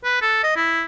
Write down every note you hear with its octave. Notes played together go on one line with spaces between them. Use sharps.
B4
A4
D#5
E4